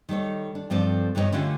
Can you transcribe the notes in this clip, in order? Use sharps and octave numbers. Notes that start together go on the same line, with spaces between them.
D#3 G3 A4 C#5
D4
G2 F3 C4 A4 D5
G2 D#3 B3 G4 C#5 D#5
D3 A3 C#4 D4 F4 G4